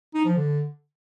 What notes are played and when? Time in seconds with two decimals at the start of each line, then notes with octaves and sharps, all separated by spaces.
0.14 D#4
0.25 F3
0.36 D3